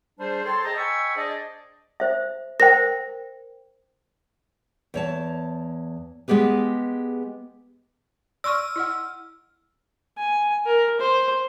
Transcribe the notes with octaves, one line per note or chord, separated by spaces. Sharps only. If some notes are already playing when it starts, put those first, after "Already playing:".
G3 D4 G#4 C5
A4 C#5 G5 A5 C6
G#4 C5 D#5 A5 A#5
D#5 G5 G#5 B5 C#6 E6
D4 G#4 C5 D5 D#5
C5 E5
A#4 C5 G5 A#6
E2 C#5 A5
G#3 B3 G4 G#4 B4
D5 C6 C#6 E6 F6
E4 D#5 F#5
G#5
A#4
C5